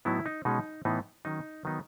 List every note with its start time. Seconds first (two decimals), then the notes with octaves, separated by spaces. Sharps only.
0.05 A2 F#3 B3 D#4 E4
0.26 D#4
0.45 B2 G#3 C#4 D#4
0.85 A2 E3 B3 D#4
1.25 D#3 F#3 C#4 D#4
1.65 D#3 F#3 B3 D#4